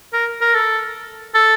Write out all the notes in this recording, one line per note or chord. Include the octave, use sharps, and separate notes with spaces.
A#4
A#4
A4
A4